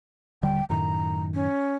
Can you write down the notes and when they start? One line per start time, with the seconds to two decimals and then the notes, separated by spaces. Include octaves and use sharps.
0.43 D#1 D3 G3 G5
0.70 F#2 A2 D#3 A#5
1.34 C#4